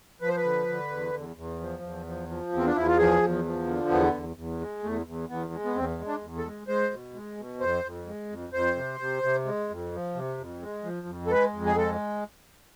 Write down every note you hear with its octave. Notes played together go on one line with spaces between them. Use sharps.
F3 B4
C5
B4
D3
D3
E2
E2
E2
F3
E2
F3
F3
E2 C4
D4
E2 E4
F4
F3 G#4
E2
F3
D3
E2 B3
E2
E2
G#3
E2 A3
E2
E2 B3
G#3
B3
E2 C4
G#3
D4
E2
A4
G#3
G#3 C5
B2
G#3
B2
F2 C5
F2
G#3
F2
F2 C5
C3
C3
C3
G#3
F2
F3
C3
F2
G#3
F3
F2
A4
G#3 B4
F2
G#4
G#3 A4